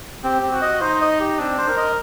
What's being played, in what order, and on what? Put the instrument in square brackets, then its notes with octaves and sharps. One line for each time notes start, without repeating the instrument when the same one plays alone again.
[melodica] C4 [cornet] G4
[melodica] C4
[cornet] F#4
[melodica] D#5
[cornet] D#4 [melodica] C5
[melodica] D#5
G4
[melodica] C4 [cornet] D4
[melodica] C5
[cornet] A#4
[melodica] D#5